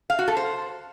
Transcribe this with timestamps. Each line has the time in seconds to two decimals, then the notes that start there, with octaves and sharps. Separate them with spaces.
0.10 F5
0.19 F#4
0.28 A4
0.37 C5